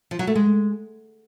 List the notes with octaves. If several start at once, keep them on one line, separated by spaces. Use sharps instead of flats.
F3
F#3
A3
G#3